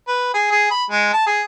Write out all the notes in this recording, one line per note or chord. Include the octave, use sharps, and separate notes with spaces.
B4
G#4
G#4
B5
G#3
A5
G#4